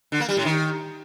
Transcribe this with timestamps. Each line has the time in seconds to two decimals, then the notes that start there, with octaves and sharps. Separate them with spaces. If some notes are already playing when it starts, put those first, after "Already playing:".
0.12 D3
0.20 A#3
0.29 G3
0.37 A2
0.45 D#3